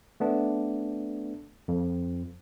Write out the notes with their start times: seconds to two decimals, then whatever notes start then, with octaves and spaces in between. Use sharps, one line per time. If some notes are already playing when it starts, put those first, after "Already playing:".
0.20 A3 B3 D4
1.68 F2